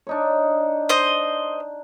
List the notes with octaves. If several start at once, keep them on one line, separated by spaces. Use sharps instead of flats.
D4 D#4 C#5
C5 D#5